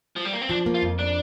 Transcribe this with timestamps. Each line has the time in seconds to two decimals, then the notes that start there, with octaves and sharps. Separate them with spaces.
0.16 F3
0.25 G3
0.33 A#3
0.42 C4
0.49 F3 D4
0.66 A#3
0.75 F4
0.82 F2
0.99 A#3 D4